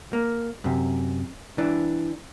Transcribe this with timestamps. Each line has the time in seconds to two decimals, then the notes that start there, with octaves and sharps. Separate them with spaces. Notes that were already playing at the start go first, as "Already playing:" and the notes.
0.13 A#3
0.64 F#2 C3
1.58 E3 D4